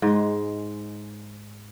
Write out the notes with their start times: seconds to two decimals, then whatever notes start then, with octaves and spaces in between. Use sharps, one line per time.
0.02 G#2 G#3